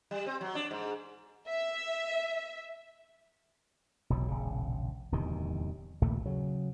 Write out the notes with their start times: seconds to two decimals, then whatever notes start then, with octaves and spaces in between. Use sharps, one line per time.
0.11 G3
0.26 C4
0.41 F#3
0.55 D4
0.71 G#2
1.47 E5
4.10 E1 B1 B2 F#3
4.28 E1 A#1 C#3
5.12 D1 E2 C3 D#3
6.02 A#1 D#2 A#2 A3
6.26 C#3 F#3